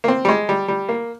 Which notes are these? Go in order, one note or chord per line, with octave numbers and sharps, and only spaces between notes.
A#3
C4
G3
G#3
G3
G3
A#3